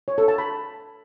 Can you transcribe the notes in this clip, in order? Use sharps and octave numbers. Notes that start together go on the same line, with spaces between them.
C#5
A4
A5
B5